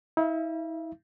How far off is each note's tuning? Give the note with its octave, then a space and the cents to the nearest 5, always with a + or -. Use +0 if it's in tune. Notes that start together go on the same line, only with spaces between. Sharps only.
E4 -40 E5 +45